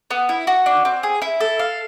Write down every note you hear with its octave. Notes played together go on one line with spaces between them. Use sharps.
B3
E4
F#4
D4
C4
G#4
E4
A4
F5